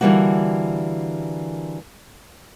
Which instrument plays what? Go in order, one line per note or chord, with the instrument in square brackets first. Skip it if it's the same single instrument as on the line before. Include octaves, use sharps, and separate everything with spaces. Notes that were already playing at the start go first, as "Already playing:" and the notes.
[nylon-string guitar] D3 E3 F3 G3 A#3 F#4